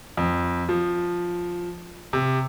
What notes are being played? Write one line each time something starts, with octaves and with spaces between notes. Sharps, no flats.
F2
F3
C3